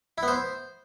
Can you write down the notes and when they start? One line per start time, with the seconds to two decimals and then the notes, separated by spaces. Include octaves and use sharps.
0.18 E4
0.23 B3
0.28 C5